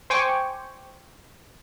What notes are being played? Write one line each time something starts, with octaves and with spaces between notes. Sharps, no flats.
C5 G5 G#5 C#6 D6